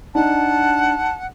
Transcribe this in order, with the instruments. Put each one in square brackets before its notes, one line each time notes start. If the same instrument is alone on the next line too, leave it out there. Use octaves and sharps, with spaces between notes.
[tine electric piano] D4 [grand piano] D#4 [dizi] F#5 [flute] A5